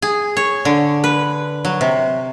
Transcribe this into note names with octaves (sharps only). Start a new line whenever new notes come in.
G#4
C#5
D3
B4
F#3
C3